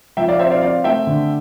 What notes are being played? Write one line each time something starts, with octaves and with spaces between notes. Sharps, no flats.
F3 E5 G5
D5 F5
C4 C5 E5
D5 F5
C4 D5 F5
A3 E5 G5
D3